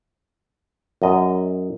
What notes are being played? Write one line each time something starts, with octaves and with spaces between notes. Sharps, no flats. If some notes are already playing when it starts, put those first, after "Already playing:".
F#2 D#5